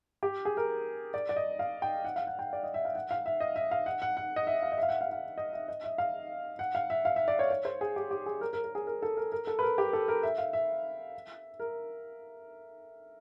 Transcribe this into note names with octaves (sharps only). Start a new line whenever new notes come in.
G4
G#4
A#4
D5
D5
D#5
F5
G5
F#5
F5
F#5
G5
D5
D#5
E5
F5
F#5
F5
E5
D#5
E5
F5
F#5
F#5
F#5
D#5
E5
F5
D#5
E5
F5
F#5
F5
F5
D#5
E5
D#5
E5
F5
F#5
F5
E5
F5
E5
D5
C#5
C#5
C5
G#4
G4
G4
G#4
A#4
A#4
A#4
G#4
A#4
A4
A#4
A#4
A4
B4
A#4
G4
A4
A#4
E5
F5
E5
A#4